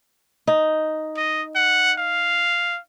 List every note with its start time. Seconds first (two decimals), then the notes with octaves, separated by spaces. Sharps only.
0.47 D#4
1.17 D#5
1.55 F#5
1.98 F5